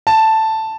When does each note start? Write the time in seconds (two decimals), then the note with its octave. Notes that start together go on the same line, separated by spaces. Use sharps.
0.07 A5